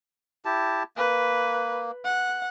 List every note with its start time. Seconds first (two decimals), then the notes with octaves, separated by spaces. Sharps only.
0.45 E4 G4 A5
0.97 A#3 B4
2.05 F#5